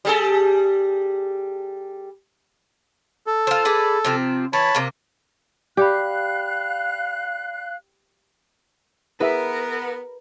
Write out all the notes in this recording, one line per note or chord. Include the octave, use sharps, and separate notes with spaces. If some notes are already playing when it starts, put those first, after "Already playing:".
G3 G#4 A4
A4
F4 C5
G#4 B4 D5
C3 F3 C4
E3 C#5 A5 B5
C3 A#3
G4 D5 F5 G5 B5 F#6
B3 E4 G#4 A#4 B4 E5